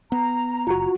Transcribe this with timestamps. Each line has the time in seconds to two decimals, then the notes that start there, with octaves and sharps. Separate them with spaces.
0.12 B3 A#5
0.67 F#1 F4 F#4